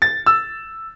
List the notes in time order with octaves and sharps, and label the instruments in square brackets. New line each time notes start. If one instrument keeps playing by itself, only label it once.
[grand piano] A6
E6